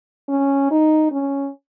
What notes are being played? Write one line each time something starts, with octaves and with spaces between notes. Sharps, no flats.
C#4
D#4
C#4